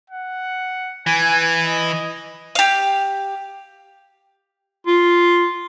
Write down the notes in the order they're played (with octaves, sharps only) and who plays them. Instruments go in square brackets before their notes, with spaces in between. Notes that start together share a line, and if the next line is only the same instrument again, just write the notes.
[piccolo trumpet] F#5
[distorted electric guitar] E3 [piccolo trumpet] G#5
[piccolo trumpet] D#5
[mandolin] G4 F5
[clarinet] F4